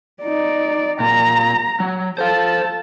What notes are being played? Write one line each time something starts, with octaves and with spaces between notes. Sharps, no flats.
D#4 D5
A#2 A#5
F#3
A4 C5 F5 A5